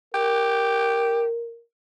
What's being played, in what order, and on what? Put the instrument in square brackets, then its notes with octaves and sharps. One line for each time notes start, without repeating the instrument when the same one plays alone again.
[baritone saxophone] G4 [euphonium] A#4